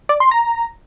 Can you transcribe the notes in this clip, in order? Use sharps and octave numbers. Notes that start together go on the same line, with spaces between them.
D5
C6
A#5